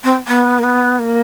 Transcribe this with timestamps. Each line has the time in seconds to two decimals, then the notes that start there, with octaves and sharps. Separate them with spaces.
0.04 C4
0.27 B3
0.59 A#3
0.63 B3
0.99 A#3